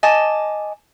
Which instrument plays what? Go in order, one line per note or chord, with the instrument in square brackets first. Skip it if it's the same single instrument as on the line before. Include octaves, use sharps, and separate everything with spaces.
[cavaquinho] D#5 G#5 A5 D6